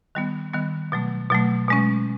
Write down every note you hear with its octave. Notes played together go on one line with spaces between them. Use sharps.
D#3 G3 B3
D#3 G3 B3
B2 F#3 A3
B2 F#3 A3
B2 G#3 C#4